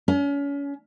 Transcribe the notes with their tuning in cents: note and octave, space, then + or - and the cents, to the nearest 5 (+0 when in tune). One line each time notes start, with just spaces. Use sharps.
C#4 +35